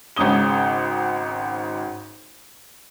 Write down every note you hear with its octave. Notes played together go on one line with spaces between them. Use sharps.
G#1 G#2 C#3 D#6 G7